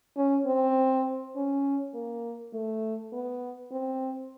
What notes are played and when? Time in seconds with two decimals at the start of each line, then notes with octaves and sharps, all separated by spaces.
0.17 C#4
0.46 C4
1.36 C#4
1.94 A#3
2.54 A3
3.13 B3
3.72 C4